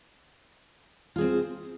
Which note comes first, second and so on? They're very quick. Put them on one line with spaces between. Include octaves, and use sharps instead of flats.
F4 G#4 C4 C5